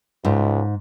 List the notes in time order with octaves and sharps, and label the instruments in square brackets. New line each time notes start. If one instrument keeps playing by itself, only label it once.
[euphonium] C#2 [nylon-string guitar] G#2